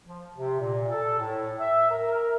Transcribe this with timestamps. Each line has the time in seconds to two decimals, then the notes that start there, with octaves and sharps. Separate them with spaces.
0.05 F3
0.35 C3
0.59 A#2
0.91 A4
1.19 A2
1.59 E5
1.90 A#4
2.13 A#4